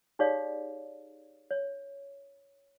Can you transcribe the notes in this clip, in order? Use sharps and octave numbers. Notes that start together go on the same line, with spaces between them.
D#4 G4 G#4 C#5 D5 F5
C#5